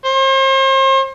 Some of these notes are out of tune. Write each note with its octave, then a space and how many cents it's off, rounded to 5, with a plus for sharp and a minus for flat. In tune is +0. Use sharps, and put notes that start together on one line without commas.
C5 +40